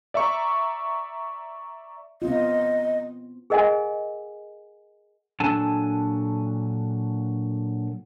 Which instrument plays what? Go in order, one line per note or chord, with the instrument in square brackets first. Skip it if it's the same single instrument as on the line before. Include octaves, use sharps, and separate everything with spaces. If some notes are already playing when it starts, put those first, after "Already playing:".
[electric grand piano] D5 E5 A#5 C#6
[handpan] B3 C4 F4 [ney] D#5
[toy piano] G#4 A#4 D#5 F#5 G#5
[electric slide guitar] A#2 F#3 D4 A4 G#5 A5